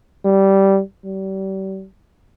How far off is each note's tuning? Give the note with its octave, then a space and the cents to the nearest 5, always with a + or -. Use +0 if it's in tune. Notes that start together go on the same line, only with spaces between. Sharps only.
G3 -10
G3 -35